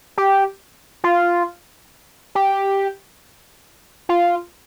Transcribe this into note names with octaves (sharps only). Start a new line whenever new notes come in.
G4
F4
G4
F4